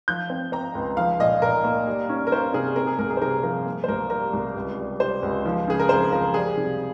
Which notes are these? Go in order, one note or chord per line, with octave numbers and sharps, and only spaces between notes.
F3 G6
C4
C4 A#5
C#2
F3 F5
A#2 D#5
A#2 A#4
A#3
G3
C#4
A#4
C#4 C5
C3 G#4
C4 A#4
G#4
C2 A#4
G#4
C5
C3 A#4
F3 A#4
A#3
C5
C2 A#4
G3 A#4
C2
C#2
G3
G3 C5
C#2
F3
C#3 G#4
A#4
F2 C5
F3 A#4
G3 G#4
C3